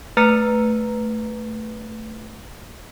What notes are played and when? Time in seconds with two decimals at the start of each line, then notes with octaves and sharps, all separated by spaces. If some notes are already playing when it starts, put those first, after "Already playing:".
0.17 A3 B4 A#5 F6 A6 C#7